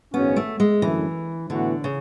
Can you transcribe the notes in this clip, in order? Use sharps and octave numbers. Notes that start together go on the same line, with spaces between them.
G#1 F#2 C#3 F#3 B3 C#4
A3
G#3
F#2 D3 E3 A3 E4
A2 D3 E3 B3 F#4
C#3